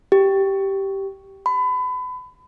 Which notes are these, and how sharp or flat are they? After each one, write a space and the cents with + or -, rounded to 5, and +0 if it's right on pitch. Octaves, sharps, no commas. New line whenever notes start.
G4 -10
B5 +30